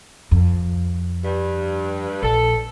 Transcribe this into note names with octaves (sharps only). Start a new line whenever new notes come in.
F2
G2
A#1 A4